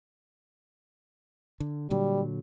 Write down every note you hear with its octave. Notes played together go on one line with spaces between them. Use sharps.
D3
A#2 D3 F#3 G3